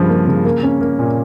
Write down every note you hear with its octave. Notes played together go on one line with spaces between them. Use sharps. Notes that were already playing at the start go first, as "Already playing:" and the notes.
Already playing: G2 C#3 F3
A#3
C#3
A#3
C#4
A#3
A#2